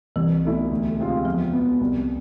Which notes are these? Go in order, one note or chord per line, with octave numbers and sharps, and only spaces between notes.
C2 E3
B2 A3 E4
D2
C3 G#3 C4 F4
E2 F3
B2 B3
C2